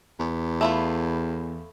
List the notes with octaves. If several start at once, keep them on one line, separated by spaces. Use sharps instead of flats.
E2
A3 E4 F4